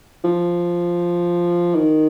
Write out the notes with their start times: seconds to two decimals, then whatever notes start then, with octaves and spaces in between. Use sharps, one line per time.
0.25 F3
1.75 D#3